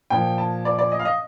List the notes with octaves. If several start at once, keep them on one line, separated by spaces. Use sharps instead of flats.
A#2 F3 G5
A5
D5
D5
D#5
F5
D#5